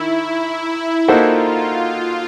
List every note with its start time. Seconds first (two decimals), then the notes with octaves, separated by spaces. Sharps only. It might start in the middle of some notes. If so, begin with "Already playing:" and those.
Already playing: D#3 E4
1.07 A#3 D#4 F4 F#4 A4 C5